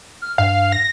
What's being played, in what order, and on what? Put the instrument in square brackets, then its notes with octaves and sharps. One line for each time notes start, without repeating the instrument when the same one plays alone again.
[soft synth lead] F6
[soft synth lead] G2 [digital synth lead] F5
[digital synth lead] A#6